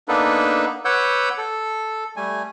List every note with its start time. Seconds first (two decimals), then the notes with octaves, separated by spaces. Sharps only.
0.08 A#3 B3 D4 D#4 A4 B4
0.85 B4 C#5 F#5 D6 E6 G6
1.38 A4
2.16 G3 A3 G#5